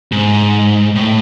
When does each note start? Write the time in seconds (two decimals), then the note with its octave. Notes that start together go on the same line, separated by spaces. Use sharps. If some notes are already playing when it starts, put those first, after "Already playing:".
0.12 G#2
0.95 A2